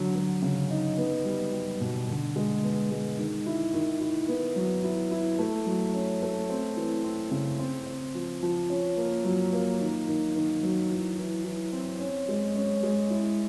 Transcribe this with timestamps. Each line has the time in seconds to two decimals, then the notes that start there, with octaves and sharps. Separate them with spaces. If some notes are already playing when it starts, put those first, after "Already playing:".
Already playing: D3 F#3
0.15 F#3
0.42 C#3
0.70 D#4
0.97 B3
1.25 G3
1.53 G3
1.81 B2
2.09 D3
2.36 G#3
2.63 B3
2.91 G#3
3.18 D#3
3.46 E4
3.74 D#3
4.01 E4
4.28 B3
4.56 F#3
4.84 E4
5.11 E4
5.39 A3
5.66 F#3
5.94 C#4
6.22 A3
6.50 C4
6.77 E3
7.04 C4
7.31 C#3
7.59 C4
7.87 C4
8.15 F3
8.43 F3
8.70 C#4
8.97 A#3
9.25 F#3
9.53 A#3
9.80 D#3
10.07 D#3
10.35 D#3
10.63 F#3
10.90 E3
11.18 E3
11.45 E3
11.72 C4
12.00 C#4
12.29 G#3
12.56 C#4
12.83 G#3
13.10 E4